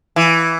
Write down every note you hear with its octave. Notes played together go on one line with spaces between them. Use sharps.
E3